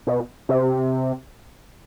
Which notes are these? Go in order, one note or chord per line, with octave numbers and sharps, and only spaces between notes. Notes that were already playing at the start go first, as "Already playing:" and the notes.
B2
C3